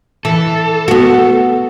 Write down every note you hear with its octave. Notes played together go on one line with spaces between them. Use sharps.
E3 A4
B3 F#4